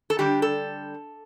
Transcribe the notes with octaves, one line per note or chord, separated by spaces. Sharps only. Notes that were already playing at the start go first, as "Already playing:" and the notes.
A4
D3 G3 D4 G4
A4